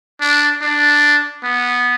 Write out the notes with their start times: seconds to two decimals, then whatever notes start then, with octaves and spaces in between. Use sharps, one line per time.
0.20 D4
0.62 D4
1.43 B3